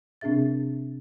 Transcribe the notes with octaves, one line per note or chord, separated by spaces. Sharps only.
C3 C4 D4 G#4 E5 A6